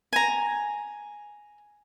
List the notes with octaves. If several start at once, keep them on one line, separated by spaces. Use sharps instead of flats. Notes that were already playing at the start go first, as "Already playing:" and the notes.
G#5 A#5